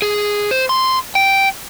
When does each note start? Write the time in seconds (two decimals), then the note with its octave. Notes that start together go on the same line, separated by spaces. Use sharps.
0.02 G#4
0.51 C5
0.69 C6
1.15 G5